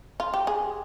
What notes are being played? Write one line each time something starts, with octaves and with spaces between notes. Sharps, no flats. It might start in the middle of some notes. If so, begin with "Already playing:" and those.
F4
G4
G#4